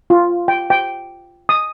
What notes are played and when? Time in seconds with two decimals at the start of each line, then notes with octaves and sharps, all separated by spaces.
0.10 F4
0.48 G5
0.70 G5
1.49 D#6